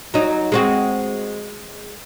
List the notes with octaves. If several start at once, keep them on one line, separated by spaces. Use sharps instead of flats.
F#3 D#4
G#3 C4 F#4